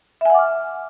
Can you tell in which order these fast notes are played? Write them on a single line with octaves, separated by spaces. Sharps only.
E5 G#5 F#5 D6 F6